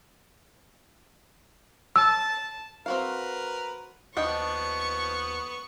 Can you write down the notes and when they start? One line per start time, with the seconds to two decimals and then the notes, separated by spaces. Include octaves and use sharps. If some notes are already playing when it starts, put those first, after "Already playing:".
1.96 A5 E6
2.86 C4 F#4 A#4 B4 F5
4.17 D#2 F3 B3 D4 D#5 G5 C#6